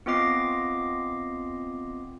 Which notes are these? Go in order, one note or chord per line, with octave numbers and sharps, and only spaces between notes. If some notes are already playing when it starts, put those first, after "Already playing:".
B3 C4 F4 D#5 D6 C7